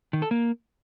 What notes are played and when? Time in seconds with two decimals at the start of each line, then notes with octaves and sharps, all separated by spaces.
0.13 D#3
0.22 A4
0.31 A#3